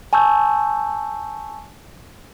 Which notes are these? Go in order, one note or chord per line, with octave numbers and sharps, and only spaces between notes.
G#5 A5 C#6 E6 G6